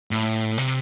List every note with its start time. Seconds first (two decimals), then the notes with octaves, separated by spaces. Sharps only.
0.11 A2
0.58 C3